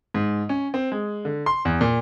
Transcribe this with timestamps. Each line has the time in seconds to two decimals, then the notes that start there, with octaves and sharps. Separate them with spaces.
0.14 G#2
0.49 C#4
0.74 C4
0.92 G#3
1.25 D3
1.46 C6
1.65 E2
1.81 A#2